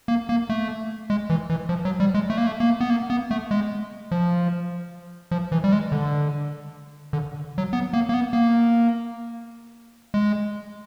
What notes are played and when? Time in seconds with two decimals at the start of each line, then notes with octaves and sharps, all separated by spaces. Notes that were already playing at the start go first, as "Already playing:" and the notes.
0.08 A#3
0.29 A#3
0.50 A3
1.10 G#3
1.30 E3
1.50 E3
1.69 F3
1.85 F#3
2.00 G3
2.14 G#3
2.30 A3
2.38 A#3
2.47 A3
2.60 A#3
2.80 B3
2.90 A#3
3.10 B3
3.31 A3
3.51 G#3
4.11 F3
5.31 F3
5.52 E3
5.64 G3
5.72 G#3
5.92 D3
7.13 D3
7.58 F#3
7.73 B3
7.93 A#3
8.09 A#3
8.14 B3
8.33 A#3
10.14 G#3